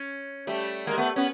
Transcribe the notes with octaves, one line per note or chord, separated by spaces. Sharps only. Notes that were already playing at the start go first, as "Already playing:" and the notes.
Already playing: C#4
G3 A3
G#3 A#3
A3 B3
B3 C#4